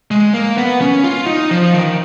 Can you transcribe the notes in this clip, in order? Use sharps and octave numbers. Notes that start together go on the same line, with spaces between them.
G#3
A#3
B3
C#4
F4
D#4
F3
D#3